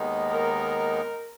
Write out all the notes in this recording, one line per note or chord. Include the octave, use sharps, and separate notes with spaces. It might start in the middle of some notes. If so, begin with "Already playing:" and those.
Already playing: D#2 D#3 G#3 B3 D#4
A#4